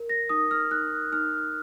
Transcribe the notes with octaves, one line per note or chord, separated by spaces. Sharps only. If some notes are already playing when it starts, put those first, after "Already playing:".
Already playing: A#4
A#6
D#4 D#6
F6
D#4 F#6
D#4 F6